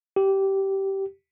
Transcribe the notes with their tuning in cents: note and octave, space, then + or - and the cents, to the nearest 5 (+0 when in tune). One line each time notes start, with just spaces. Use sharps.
G4 -15